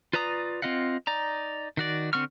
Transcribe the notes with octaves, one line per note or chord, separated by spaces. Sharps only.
F4 B4 D5 A#5 D#6
C4 F4 D#5 F5 F#5
D#4 D5 A#5
D#3 F#4 D5
D3 C4 F#5 C#6 F6